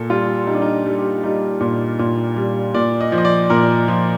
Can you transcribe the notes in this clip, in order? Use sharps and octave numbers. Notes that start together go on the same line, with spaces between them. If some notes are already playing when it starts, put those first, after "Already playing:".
Already playing: A#2 A4
G3 F4
G3 D#4
D4
D#4
G3
G4
G3 D#4
A#2
A#2
G3
A#2 D5
D#5
F3
D#5
D5
A#2 A#4
F3